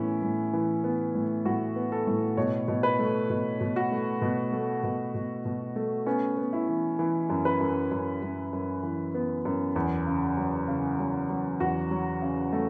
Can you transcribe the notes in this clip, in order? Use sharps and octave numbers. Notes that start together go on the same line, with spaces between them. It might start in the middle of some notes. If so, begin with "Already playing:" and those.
Already playing: A2 E3 B3 C#4 E4
A2
E3
B3
A2
A2 F#4
B3
A4
A2
B2 C#5
B2
B4
A3
B2
B2
F#4
A3
B2
A3
B2
B2
B2
A3
B3 C#4
B3
E4
E3
E3
F#2
B4
F#2
F#2
F#2
F#2
E3
B3
F#2
E2
C#3
F#3
C#3
F#3
F#3
E2 F#4
F#3
C#3
A3